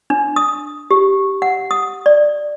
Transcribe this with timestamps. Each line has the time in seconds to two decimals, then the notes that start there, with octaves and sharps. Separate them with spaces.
0.10 D4
0.36 D#6
0.91 G4
1.42 F#5
1.71 D#6
2.06 D5